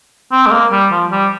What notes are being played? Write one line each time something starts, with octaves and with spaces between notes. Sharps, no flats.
C4
G#3
A#3
G3
F3
G3